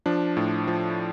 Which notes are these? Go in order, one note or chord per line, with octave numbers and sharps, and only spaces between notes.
F3 D4
A2
F3